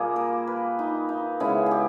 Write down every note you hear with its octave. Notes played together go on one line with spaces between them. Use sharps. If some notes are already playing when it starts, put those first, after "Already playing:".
Already playing: A#2 G3 A#3 G#4
A#4
B4
D#4
D#4
C#3 G#3 B3 E4
G4 G#4